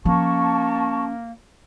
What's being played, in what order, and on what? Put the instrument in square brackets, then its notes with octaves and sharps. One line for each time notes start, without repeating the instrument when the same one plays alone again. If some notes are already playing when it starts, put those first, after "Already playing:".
[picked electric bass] F3 [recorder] A#3 [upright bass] C#4 [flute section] A5 C#6